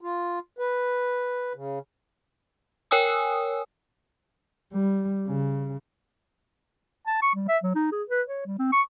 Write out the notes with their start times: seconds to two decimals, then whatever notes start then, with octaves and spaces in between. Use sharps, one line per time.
0.01 F4
0.59 B4
1.55 C#3
2.91 A#4 C#5 G5 G#5 D#6 E6
4.73 G3
5.28 C#3
7.07 A5
7.22 C#6
7.35 G3
7.48 E5
7.63 F#3
7.75 D#4
7.92 G#4
8.09 B4
8.28 C#5
8.46 G3
8.59 C4
8.73 C#6